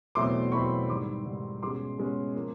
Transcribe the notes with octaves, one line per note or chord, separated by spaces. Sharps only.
E2 B2 F#3 A3 C4 C6 D6
E2 B2 F#3 A3 C4 B5 C#6
G#2 D#3 G3 C6 D6
G#2 D#3 G3
B2 G#3 C#4 C6 D6
B2 G#3 C#4
F3 A#3